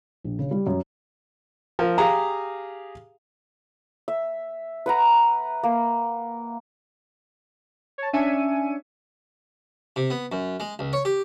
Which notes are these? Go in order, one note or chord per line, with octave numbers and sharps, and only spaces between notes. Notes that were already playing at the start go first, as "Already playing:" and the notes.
A#1
C#3
G3
F#2
F3 A#4
G4 G#4 F5 A#5
E5
B4 F#5 A#5
A#3
C#5 A5
C#4 D4 E5 G#5 C#7 D#7
C3
B3
F#2
G#3
C#2
C#5
G4